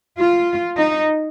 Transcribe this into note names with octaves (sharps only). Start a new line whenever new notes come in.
F4
D#4